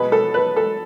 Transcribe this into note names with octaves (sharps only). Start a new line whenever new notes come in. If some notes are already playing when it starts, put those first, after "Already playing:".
Already playing: B2 G#3 B3 B4
A4
B4
A4